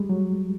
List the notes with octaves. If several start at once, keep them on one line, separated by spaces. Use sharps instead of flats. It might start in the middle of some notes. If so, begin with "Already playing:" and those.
Already playing: G3 G#3
F#3